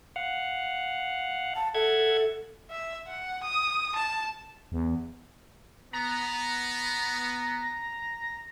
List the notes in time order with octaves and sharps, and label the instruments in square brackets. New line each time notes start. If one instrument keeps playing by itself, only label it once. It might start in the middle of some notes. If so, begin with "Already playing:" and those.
[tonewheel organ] F5 F#5
[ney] A5
[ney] A4 [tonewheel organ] E5 F#5 G#6
[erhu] E5
F#5
D#6
A5
[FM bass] E2
[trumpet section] B3 [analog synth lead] A#5